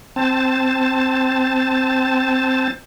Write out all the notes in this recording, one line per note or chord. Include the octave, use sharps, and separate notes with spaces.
C4 A5